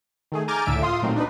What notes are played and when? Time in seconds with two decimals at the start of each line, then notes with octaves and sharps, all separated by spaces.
0.32 D#3 A3 G#4
0.48 G#5 A#5 D6 F6 G6 A6
0.66 C#2 A2 D3 E5 E6 D7
0.82 F4 F5 C6 D#6
1.02 A#2 F#3 A3 C4 D#4
1.16 D4 D#4 B4